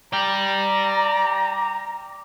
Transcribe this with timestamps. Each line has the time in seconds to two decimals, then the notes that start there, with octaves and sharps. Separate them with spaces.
0.13 D5 G5 A#5